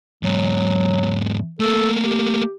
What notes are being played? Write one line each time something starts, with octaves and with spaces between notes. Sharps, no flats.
E2 G#2 F#3
A3 A#3 A4
G4